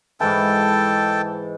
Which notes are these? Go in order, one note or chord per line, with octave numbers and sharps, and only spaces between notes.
G#2 E3 A4 G5 A5